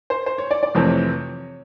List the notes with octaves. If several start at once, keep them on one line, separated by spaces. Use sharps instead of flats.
C5
C5
C#5
D5
D5
F2 C3 E3 A3 C4 C#5